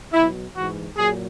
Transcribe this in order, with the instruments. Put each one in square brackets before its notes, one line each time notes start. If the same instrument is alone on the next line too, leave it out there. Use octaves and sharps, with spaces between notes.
[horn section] B2 F#3 E4
G#2 E3 F#4
A#2 F#3 G#4